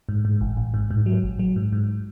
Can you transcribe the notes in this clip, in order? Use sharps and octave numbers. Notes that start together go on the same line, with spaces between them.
G#2
G#2
A1
A1
G#2
G#2
F#3
A1
F#3
G#2
G#2